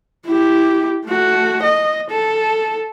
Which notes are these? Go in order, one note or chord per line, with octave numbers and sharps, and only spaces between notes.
E4 G4
A3 F#4
D#5
A4